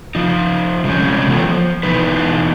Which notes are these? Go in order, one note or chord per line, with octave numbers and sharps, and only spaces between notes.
F3 D#4
C3 G3 G#3 C4 C#4
E3 B3 F4 A4 C#5 G5
F3
B2 E3 B3 D#4 B4